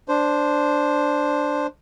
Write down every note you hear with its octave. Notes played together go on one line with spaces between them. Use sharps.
D4 C5